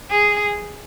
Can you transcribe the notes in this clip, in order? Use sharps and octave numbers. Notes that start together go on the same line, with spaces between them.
G#4